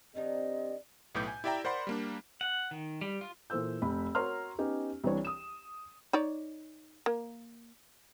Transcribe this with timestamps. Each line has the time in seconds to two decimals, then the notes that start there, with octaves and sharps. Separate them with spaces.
0.15 D#3 C4 D4 D#4 G4 D#5
1.15 B1 A2 B4 D6 G6
1.28 G#5
1.44 E4 G4 D5 E5 G5 A#5
1.64 A#4 C5 D5 F#5 B5 C6
1.87 G3 A#3 D4
2.41 F#5
2.71 D#3
3.01 G3
3.21 F4
3.50 A#2 E3 A4 C5 E6 G6
3.82 F1 B5
4.15 F#4 A#4 C#5 A#5 C6 F6
4.59 B3 C#4 D#4 G4
5.04 C2 E3 D4 C#5
5.25 D#6 E7
6.13 D#4 C#5 D5
7.06 A#3